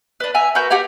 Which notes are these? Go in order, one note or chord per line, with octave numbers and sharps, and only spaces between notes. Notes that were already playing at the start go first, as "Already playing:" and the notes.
D4 B4
E5 G#5 A#5
F#4 A#4 B4 G6
G4 F#5 G#5 A#5